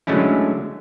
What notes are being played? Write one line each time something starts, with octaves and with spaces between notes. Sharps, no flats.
D3 F#3 G#3 A3 C#4 E4